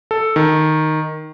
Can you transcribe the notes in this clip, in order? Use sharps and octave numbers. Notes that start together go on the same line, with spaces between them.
A4
D#3